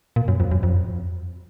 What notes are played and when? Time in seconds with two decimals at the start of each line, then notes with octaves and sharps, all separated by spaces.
0.16 A#2
0.28 F#2
0.40 F2
0.51 F#2
0.63 F2